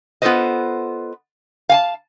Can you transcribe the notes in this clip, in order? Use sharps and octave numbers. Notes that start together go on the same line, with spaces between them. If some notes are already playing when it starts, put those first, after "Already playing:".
B3 F4 A4 B4 C5 D#5
F5 G#5 A5